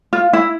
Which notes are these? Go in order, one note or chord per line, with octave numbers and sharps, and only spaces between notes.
F4
E4